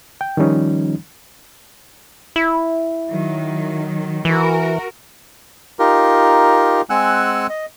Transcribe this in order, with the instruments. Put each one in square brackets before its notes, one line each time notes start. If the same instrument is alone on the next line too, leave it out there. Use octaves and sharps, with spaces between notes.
[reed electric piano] G5
D#3 F3 G3 C#4 D#4
[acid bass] E4
[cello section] D#3 F#3
[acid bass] E3 [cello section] F#4 A#4
[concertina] D#4 F4 G4 A#4
G#3 C4 F#5 G#5 E6 F#6
D#5